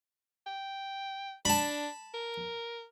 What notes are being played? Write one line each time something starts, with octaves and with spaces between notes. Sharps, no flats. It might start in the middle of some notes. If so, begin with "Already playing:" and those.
G5
D4 A5 B5
A#4